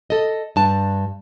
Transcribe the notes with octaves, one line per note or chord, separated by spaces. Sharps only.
A4 D#5
G2 A5